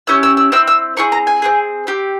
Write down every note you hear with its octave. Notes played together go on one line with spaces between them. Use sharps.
C#4 E4 G4 E6
E6
E6
C4 E4 E6
E6
C4 E4 G#4 C#6
A#5
G#5
C4 F4 G#4
C4 G4